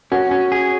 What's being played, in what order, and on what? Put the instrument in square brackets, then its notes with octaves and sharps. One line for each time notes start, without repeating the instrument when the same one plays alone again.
[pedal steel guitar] C#4 [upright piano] F#4
[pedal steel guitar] C#4
G#4